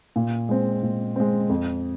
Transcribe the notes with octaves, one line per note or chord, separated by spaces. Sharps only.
A#2
G#3 C4
A#2
G#3 C4
F2